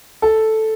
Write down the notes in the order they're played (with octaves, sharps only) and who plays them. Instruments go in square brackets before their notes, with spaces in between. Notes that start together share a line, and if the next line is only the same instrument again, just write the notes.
[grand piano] A4